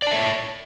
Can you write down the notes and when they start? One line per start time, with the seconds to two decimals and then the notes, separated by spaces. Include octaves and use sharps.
0.02 D5
0.07 A5
0.11 E5
0.16 C#5